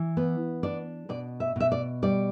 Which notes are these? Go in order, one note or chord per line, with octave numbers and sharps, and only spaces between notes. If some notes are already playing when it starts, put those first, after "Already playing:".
Already playing: E3
B3
D4 D5
B2 D5
E5
B2 E5
D5
G3 D5